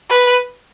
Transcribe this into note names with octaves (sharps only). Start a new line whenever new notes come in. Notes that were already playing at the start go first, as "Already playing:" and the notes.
B4